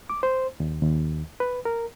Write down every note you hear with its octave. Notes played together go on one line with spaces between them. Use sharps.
D6
C5
D#2
D#2
B4
A#4